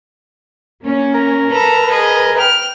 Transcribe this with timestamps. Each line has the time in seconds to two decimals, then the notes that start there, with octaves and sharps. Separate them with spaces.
0.82 A#3 C#4
1.14 A#4
1.51 A4 B4 A#5
1.90 G#4 D#5
2.37 G5 F6